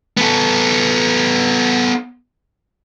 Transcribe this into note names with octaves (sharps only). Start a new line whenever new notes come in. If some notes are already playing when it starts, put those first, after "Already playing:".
B3 A4